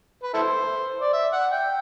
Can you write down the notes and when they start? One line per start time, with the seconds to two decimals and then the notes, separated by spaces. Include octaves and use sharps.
0.23 B4
0.34 E4 A4 C5
1.01 D5
1.13 E5
1.33 F#5
1.52 G5